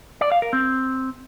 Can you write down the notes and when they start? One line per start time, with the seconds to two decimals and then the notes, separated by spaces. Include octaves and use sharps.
0.21 D5
0.32 F5
0.42 A#4
0.53 C4